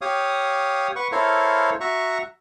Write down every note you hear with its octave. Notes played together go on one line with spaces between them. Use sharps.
G4 C#5 F5 D#6
B4 F#5 C#6
E4 A4 A#4 C5 C#5 F5
F#4 E5 A#5 C#6